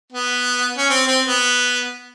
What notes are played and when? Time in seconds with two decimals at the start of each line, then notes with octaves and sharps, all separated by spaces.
0.12 B3
0.77 C#4
0.89 C4
1.08 C4
1.27 B3